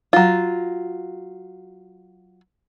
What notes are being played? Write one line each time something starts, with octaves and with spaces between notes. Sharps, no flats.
F#3 F4